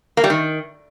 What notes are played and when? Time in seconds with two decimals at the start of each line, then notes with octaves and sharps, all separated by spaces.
0.17 A#3
0.24 G3
0.30 D#3